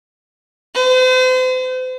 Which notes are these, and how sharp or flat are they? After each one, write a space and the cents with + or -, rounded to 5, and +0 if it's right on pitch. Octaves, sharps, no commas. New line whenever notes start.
C5 -40